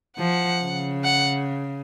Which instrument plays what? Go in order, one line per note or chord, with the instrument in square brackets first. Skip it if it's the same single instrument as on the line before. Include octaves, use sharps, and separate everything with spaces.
[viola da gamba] F3 [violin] F#5
[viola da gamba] C#3
[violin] F#5